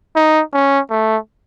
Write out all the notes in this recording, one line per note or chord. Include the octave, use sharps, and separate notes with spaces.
D#4
C#4
A3